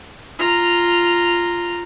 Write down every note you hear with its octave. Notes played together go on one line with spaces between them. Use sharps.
F4 A#5